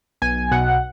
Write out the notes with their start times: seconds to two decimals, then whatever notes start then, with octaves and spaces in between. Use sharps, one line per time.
0.22 B1 G#5
0.51 B2 F#5